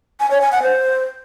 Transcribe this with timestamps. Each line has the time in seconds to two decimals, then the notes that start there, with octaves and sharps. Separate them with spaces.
0.20 G#5
0.31 C#5
0.41 G#5
0.52 F#5
0.63 C5